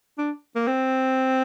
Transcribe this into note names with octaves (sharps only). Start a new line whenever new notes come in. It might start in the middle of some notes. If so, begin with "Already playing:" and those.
D4
A#3
C4